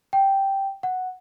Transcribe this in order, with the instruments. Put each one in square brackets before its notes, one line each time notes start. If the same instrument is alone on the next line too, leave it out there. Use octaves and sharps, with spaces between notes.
[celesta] G5
F#5